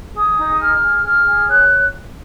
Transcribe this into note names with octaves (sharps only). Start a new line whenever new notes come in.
G#4 D#6
D#4
G#4 F6
G#4
G#4 F6
G#4
C#5 F#6